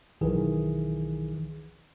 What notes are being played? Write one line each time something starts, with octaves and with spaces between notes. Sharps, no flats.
B1 D#3 E3 G#4